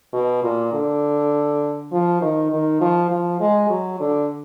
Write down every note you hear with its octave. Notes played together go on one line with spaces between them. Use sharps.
B2
A#2
D3
F3
D#3
D#3
F3
F3
G#3
F#3
D3